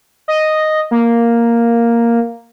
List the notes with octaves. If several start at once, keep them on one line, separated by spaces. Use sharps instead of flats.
D#5
A#3